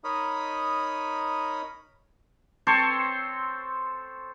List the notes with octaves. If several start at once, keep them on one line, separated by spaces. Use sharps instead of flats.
D#4 A#4 C#5 D#5 B5 D#6
C4 A4 C5 C#5